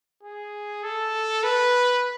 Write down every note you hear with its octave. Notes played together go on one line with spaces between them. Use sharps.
G#4
A4
B4